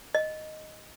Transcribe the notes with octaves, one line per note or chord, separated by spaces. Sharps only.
D#5